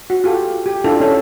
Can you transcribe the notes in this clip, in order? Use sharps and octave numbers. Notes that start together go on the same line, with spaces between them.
F#4
F4 G4 A4
G4
D4 E4 F4 A4
C#4 A4 E5